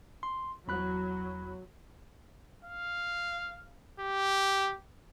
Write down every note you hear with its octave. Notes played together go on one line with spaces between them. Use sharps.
C6
E2 F#3 B5 F#6
F5
G4